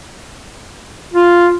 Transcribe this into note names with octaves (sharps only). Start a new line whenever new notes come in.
F4